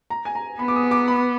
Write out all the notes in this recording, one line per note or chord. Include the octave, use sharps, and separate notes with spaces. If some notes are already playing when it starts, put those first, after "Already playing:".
A#5
G#5
A#5
B3 B5
D6
D#6
D6
B5